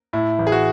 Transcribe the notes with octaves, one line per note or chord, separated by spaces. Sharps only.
A2 E4
A1
G#4
F#4